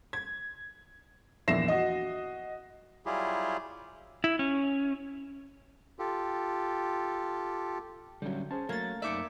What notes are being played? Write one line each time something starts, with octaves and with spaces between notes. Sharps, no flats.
G#6
A#1 E2 E5 A#6 C7 E7
F#4 D#5
F#3 G3 E4 F4 G4 G#4
E4
C#4
F4 G4 A4
D3 F#3 G3 C#4
C#4 G#4 C5 A5
F#3 A3 A#3 G#6 A6
F#2 D#4 D5 E5 D6 C#7